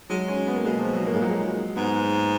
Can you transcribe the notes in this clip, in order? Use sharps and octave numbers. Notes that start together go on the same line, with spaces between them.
F#3 G#3
C#4
B3
A#3
B2 G#3
F3
F#3
A#3
G#2 G#3
A#2 F#3
G#3
G#2 B3